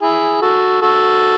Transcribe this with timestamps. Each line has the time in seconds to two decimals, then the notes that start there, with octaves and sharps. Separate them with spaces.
0.01 E4 G#4
0.41 F#4 A4
0.82 F#4 A4